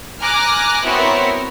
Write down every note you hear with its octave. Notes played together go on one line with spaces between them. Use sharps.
G#5 A#5 D6 F6 F#6 A#6
B3 C4 E4 F#4 A#4 C#5